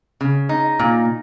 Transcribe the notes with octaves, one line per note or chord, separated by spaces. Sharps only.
C#3
D#4
A#2